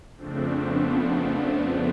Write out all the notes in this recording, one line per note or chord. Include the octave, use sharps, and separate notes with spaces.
F2 C#3 F3 A3 C4 D4
B3